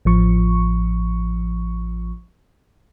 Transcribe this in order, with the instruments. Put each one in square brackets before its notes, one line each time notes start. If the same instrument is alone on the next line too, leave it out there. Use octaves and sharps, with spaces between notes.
[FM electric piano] A1 F3 C#6